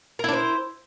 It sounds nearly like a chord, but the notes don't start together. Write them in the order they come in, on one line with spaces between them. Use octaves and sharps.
A#4 E4 D4 C5